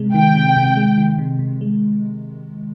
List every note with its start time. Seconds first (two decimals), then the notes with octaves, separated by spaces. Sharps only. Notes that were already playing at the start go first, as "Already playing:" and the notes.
Already playing: C3 G#3
0.14 D#3 G5
0.35 C3
0.57 C3
0.77 G#3
0.98 D#3
1.19 C3
1.39 C3
1.61 G#3